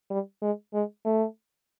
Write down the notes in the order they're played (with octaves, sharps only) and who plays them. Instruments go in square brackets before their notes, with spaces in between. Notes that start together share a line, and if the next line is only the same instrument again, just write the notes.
[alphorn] G3
G#3
G#3
A3